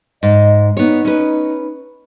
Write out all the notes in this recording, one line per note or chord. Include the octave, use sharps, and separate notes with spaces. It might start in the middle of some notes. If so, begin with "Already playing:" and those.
G#2 D#5
B3 D#4 C#5
C#4 B4